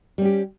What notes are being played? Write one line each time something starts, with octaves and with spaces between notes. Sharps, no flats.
G3 C#4 G4